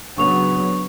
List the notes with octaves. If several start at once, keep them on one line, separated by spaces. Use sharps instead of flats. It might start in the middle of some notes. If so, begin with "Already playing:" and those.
C#3 F#3 B3 D4 C#6 F7